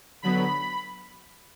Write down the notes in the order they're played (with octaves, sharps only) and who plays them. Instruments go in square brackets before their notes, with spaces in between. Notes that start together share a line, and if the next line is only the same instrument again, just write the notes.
[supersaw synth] D3 F#3 B3 B5